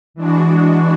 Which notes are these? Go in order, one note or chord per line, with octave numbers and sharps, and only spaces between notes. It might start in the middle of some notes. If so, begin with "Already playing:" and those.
E3 G#3 D4 F#4